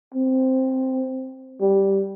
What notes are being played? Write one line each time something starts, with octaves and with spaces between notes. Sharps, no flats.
C4
G3